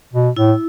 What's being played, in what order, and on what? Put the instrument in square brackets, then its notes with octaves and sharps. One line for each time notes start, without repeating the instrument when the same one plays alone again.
[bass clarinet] B2
[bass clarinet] A2 [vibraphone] E4